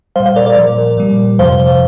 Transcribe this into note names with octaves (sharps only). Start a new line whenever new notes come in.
A#2 G3 C5 F5
C5 F5
A#4 D5
A#4 D5
A#2 F3
A#2 G3
F2 C3 F3 C5 F5